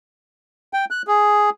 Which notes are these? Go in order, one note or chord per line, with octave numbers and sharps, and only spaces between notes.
G5
F#6
G#4